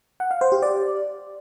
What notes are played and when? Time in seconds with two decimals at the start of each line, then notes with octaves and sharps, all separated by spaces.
0.20 F#5
0.31 F5
0.41 C5
0.52 G4
0.62 D5